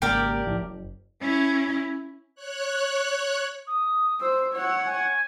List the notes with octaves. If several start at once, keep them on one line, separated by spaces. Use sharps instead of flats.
G#1 C#3 A#3 G4 A#4 D5
B1 A2 F3
F#1
C#4 E4
C#5 F#6
D#6
C5 E6
C#5 F#5
G#5